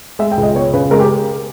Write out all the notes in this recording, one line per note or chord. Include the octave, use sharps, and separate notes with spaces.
G#3 E5
G5
C#2
D#5
B3 C#5
C#3 B4
G#3 A#4
G4